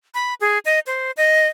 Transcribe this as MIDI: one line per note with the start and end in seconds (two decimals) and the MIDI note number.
0.14 0.34 83
0.41 0.59 68
0.65 0.79 75
0.87 1.11 72
1.17 1.47 75